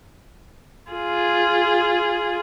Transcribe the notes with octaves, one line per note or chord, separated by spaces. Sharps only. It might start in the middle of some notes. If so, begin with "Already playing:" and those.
F4 G#4